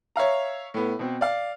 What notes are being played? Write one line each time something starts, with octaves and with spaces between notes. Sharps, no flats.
C#5 E5 F5 A#5
A2 B3
B2 C4
D5 F5